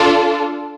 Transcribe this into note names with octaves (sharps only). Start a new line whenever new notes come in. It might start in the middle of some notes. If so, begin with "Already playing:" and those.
Already playing: D4 F4 A4